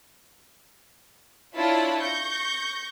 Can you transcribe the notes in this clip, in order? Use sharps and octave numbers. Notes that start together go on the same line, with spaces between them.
D4 E4 F4 C#5 A5 B5
C#6 G6 A#6